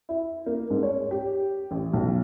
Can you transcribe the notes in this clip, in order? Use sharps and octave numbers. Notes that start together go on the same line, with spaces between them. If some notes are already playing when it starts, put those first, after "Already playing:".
E4
A#3
G#2
C#5
G4
A1
B1